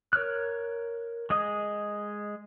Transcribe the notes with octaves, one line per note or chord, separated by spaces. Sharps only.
A#4 C#5 F6 F#6
G#3 G#4 D#5 D#6